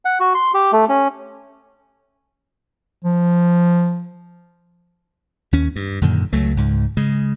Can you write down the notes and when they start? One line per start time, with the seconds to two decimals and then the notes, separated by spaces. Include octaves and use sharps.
0.05 F#5
0.20 F#4
0.35 C6
0.54 G4
0.72 A3
0.89 C#4
3.04 F3
5.52 D#2 C#4
5.76 G2
6.01 F#2 A#2 D3 D#3
6.33 C#2 F#3 A3
6.57 C#2 G#2
6.97 C#3 G#3